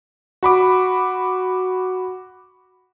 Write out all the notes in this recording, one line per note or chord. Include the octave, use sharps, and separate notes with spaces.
F#4 B5 D6